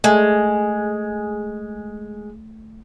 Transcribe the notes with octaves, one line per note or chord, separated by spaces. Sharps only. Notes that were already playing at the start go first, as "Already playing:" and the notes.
G#3 A3